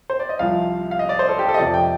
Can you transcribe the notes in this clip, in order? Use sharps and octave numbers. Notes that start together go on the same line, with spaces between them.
C5
D5
D#5
C2 C3 F3 F5
F5
D#5
D5
C5
A4
G4
A4
D#5
F2 C3 F3 D5
G5